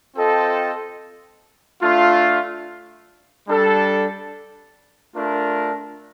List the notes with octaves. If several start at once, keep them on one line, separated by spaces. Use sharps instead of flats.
C4 F4 A4 D#5 G5
A3 D4 F4
G3 D4 A4
A3 D4 F4 A#4